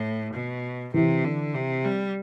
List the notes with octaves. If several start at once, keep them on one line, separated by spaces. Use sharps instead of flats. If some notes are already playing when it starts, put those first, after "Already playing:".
Already playing: A2
B2
C3 E3
D3
C3
G3